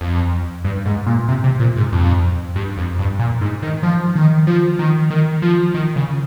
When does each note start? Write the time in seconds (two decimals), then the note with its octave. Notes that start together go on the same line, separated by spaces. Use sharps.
0.01 F2
0.64 G2
0.86 G#2
1.06 A#2
1.28 C3
1.44 C3
1.60 A#2
1.77 G#2
1.92 F2
2.56 G2
2.78 F2
2.99 G2
3.19 A#2
3.41 G#2
3.62 D#3
3.83 F3
4.16 D#3
4.47 F3
4.79 D#3
5.10 D#3
5.42 F3
5.74 D#3
5.96 C#3